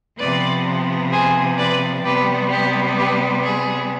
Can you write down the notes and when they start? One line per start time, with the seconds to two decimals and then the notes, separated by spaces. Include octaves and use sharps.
0.18 C3 F3 B3 B4 D5
1.12 G#4 C5
1.58 B4 D5
2.04 C3 G3 B3 G4 B4
2.50 G4
2.97 G4 B4
3.43 G#4